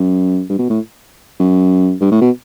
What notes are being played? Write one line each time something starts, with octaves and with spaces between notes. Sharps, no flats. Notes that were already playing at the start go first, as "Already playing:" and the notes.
Already playing: F#2
G2
B2
A2
F#2
G2
A2
B2